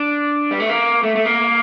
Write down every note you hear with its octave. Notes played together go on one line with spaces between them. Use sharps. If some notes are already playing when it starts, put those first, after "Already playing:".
Already playing: D4
G3
A3
A#3
A3
A3
A#3